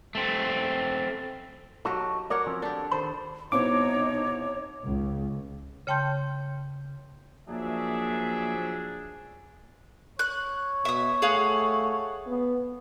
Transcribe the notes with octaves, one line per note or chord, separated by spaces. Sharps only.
A3 C4
F#3 D#4 F#4 G4 A4 C#5
A#4 C#5 D5 F#5
F3 C4 C#4
D4 G4 A4
D#3 A4 C5 B5
C2 B2 D#4 C5 C#5 D6
C#2
C#3 C#5 G5 A5 C6 G6
F3 F#3 A#3 D4 G#4 E5
C#5 F#6
B2 E5 D#6
A3 G#4 F5 F#5
B3